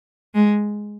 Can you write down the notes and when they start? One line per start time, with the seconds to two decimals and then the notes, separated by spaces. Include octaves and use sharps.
0.35 G#3